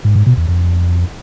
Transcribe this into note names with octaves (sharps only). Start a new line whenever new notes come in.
G#2
G#2
B2
E2
F2